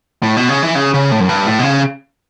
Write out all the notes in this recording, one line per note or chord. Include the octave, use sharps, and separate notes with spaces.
A2
B2
C#3
E3
C#3
C#3
A2
F#2
G2
A2
B2
C#3